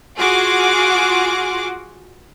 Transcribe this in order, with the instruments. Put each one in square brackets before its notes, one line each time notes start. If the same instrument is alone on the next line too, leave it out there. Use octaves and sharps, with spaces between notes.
[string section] F4 F#4 G#4 F#5 C6 D6